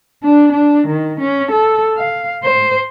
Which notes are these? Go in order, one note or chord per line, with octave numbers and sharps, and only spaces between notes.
D4
D4
D#3
C#4
A4
F5
C5